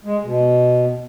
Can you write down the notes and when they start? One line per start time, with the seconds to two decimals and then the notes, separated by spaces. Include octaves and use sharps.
0.05 G#3
0.24 B2